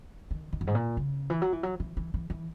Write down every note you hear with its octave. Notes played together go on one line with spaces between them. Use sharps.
D#3
D#3
F#2
G#2
A#2
C#3
E3
F#3
E3
F#3
E3
E3
E3
E3